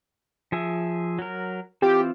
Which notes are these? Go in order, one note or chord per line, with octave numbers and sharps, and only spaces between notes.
F3 G#4 E5
F#3 A#4
E3 C4 F4 G4